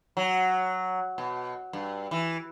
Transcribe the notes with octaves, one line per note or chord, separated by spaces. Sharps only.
F#3
B2
G2
E3